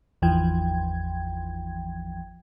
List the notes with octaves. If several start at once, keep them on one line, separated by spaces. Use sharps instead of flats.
G#1 E2 E3 F3 G5 G#6